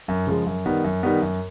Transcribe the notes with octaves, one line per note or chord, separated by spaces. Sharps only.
F#2
C#3 F3 G#3
F#2
D#3 G3 B3
F#2
D#3 G3 B3
F#2